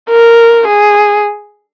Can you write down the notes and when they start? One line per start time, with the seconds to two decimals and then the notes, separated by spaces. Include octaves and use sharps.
0.10 A#4
0.67 G#4